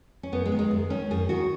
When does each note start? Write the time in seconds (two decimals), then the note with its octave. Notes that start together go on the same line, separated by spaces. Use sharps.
0.23 C#4
0.32 F#2 B3
0.46 G#3
0.52 D#3
0.59 G#3
0.71 F#2
0.90 D#3 C#4
1.11 F#2 G#4
1.29 D#3 F#4